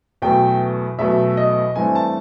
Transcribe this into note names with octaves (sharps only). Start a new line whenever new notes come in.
E2 B2 F#3 A3 G5
E2 B2 F#3 A3 E5
D#5
G2 E3 A3 C4 G#5
A5